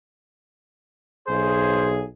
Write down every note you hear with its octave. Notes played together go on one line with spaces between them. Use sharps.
B1 G#4 C5